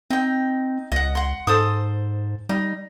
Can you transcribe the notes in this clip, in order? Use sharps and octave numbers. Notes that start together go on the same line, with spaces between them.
C4 D#4 G5
C#2 D#5 F#5
F#5 C6
G#2 A4 C5 D#6
G3 D#4